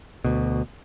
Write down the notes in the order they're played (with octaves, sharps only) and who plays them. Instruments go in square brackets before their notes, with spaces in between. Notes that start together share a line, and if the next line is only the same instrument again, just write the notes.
[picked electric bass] D2 B2